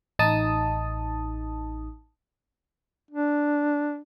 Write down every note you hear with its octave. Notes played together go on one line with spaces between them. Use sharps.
A1 D#4 A5 D#6
D4